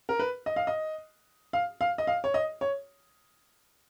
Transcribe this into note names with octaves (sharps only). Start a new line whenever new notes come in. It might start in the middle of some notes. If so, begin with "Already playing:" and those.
A#4
B4
D#5
F5
D#5
F5
F5
D#5
F5
C#5
D#5
C#5